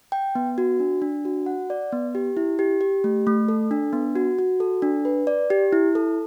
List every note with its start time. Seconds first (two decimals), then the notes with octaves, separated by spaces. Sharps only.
0.12 G5
0.35 B3
0.58 F#4
0.80 D4
1.02 D4
1.25 F#4
1.46 F#5
1.70 D5
1.92 B3
2.15 G4
2.37 E4
2.59 G4
2.81 G4
3.04 A3
3.27 A3
3.48 A4
3.71 D4
3.93 B3
4.16 F#4
4.39 F#4
4.60 A4
4.82 D4
5.05 B4
5.27 D5
5.50 G4
5.73 E4
5.95 A4